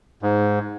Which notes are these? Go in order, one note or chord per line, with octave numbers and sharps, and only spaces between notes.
G#2